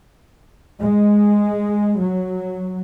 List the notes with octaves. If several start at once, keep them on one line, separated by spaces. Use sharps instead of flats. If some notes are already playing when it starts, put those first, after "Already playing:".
G#3
F#3